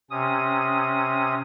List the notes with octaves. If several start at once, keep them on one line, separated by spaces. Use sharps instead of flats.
C3 C#4 D#6